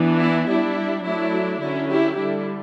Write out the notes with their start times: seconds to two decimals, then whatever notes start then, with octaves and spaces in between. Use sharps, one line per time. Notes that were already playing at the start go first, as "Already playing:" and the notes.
Already playing: E3 B3 D4
0.19 E4
0.47 G3 D4 E4
1.04 F#3 A3 D4 E4
1.60 D3 F#3 C#4 E4
1.89 E4 G4
2.17 D3 G3 D4 E4